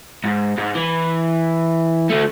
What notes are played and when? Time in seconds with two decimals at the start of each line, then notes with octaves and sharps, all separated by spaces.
0.24 G#2
0.58 G#2
0.75 E3
2.10 D3 A3